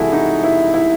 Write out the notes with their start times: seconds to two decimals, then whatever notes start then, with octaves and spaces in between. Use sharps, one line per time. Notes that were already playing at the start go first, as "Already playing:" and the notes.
Already playing: C2 C3 E3 G#3 E4 F#4 G#4 A4
0.12 D#4 F#4
0.43 E4
0.74 E4